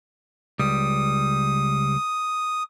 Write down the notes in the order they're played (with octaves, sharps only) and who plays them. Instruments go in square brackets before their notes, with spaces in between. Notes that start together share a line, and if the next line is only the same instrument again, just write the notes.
[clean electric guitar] C#2 G3 [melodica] D#6